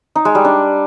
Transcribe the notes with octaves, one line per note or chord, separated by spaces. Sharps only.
D#4
G#3
G3
D4